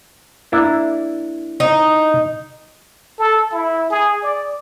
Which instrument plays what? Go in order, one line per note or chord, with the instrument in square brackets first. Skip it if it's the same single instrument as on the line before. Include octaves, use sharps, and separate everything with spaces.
[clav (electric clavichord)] A#3 D4 E4
[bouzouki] D#4
[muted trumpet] A4
E4
G#4
D5